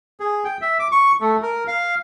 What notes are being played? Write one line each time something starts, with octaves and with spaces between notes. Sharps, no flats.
G#4
G5
E5
D6
C#6
A3
A#4
F5